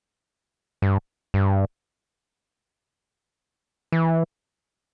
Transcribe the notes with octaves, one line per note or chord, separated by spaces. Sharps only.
G2
G2
E3